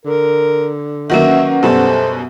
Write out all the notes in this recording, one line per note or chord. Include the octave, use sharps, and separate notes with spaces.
D3 A#4
D#3 F#3 A#3 C#4 B4 E5 F#5
F#2 B2 G3 A4 C5